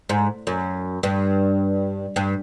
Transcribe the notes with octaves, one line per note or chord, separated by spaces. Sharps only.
G#2
F#2
G2
G2